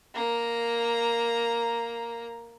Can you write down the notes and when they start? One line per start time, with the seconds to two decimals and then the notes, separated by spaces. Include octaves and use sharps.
0.14 A#3 A#5